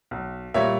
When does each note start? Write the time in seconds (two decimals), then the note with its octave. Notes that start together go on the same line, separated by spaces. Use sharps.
0.11 B1
0.54 A#2 G3 C#5 E5